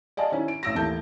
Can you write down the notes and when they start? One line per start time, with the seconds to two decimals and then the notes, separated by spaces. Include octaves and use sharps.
0.17 D5 D#5 F5 G#5 A5
0.32 D#3 C#4 E4
0.48 D7
0.63 A1 E6 A#6
0.75 D#2 E3 A3 A5 G6